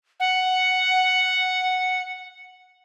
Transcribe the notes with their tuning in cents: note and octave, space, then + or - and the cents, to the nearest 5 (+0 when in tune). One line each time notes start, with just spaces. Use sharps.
F#5 +0